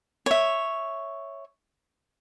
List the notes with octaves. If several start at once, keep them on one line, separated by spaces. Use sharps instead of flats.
C#5 E5